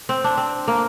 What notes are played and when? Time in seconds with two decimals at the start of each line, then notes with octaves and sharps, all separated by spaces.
0.09 C4
0.24 D4
0.37 C4
0.68 A#3